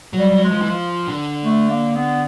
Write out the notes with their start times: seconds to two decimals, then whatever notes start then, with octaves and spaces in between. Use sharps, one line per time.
0.13 F#3
0.19 G3
0.31 F#3
0.44 G#3
0.51 F3
0.62 E3
0.69 F3
1.08 D3
1.45 A3
1.70 A#3
1.96 B3